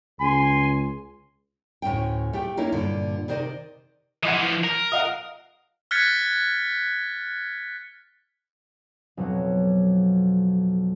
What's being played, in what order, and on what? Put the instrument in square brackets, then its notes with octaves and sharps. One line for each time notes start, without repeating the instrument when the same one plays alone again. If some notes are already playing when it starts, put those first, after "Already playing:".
[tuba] C#2 [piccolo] G#5 [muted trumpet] C6
[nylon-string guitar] D2 A2 C#4 G5
A3 G4 G5
A#3 C#4 D#4 E4
G2 A#2 D3
C3 D#3 C5 D5 D#5
[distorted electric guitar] E3 F3 [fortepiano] D#5 F#5
[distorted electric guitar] A#4
[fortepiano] D#5 F5 F#5
[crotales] F6 F#6 G#6 A6 B6 C#7
[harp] B1 F2 F#3 F#4